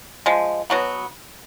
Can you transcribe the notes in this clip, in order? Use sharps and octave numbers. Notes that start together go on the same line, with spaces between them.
F3 G#3
B2 F#3 B3